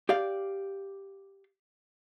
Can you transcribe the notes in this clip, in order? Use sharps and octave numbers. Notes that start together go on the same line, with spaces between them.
G4 D5 F5